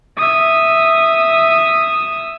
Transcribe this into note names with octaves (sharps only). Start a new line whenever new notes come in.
E5 D#6